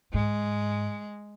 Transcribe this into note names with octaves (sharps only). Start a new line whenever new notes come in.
G#2 G#3